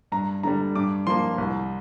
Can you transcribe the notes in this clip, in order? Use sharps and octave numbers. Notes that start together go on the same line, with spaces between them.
G2 A#5
D3 G3 A#5
G2 D6
F3 A#3 C6
C2